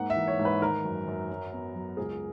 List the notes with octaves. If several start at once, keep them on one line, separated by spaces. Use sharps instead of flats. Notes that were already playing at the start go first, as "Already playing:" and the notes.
Already playing: G#2 A#3 F#5
E5
E3
C#5
G#2
B4
D#3 A#4
F#2
F#2
F#3
B3
F#3
C#2 G#4